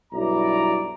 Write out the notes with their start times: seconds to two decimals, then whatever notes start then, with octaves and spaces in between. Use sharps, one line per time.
0.13 B1 G2 E4 D5 A#5